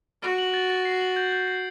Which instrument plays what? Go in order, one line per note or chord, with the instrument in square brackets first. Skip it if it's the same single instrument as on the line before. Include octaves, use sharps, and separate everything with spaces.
[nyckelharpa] F#4 [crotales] D7
[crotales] F#7
A6
A6
C7
F#7
G6
G6
C7